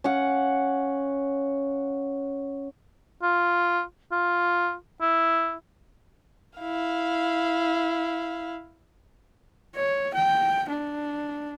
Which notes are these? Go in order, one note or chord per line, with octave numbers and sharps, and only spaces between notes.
C#4 F5 F#5
F4
F4
E4
E4 F5
C#5
G5
D4